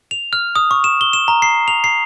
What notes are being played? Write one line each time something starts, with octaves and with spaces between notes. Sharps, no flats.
F7
F6
D#6
C#6
E7
G7
E7
A#5
C7
F7
C7